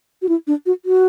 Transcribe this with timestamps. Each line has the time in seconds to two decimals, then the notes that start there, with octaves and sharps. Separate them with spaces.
0.22 F#4
0.29 E4
0.47 D4
0.66 F#4
0.85 F#4